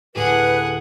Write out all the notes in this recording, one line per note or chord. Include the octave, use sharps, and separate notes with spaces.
D2 A2 G4 G#4 B4 F#5